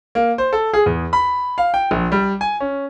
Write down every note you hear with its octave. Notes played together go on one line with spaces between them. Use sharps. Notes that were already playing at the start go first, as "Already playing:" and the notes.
A#3
C5
A4
G#4
E2
B5
F5
G5
A#1
G3
G#5
C#4